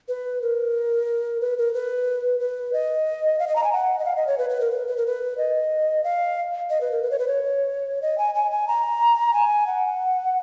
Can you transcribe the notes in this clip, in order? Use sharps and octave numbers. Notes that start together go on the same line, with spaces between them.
B4
A#4
B4
A#4
B4
B4
D#5
F5
D#5
A#5
G#5
F#5
D#5
F5
D#5
C#5
B4
B4
A#4
B4
B4
A#4
B4
D#5
F5
D#5
B4
A#4
B4
C#5
B4
C#5
D#5
G#5
G#5
G#5
A#5
G#5
F#5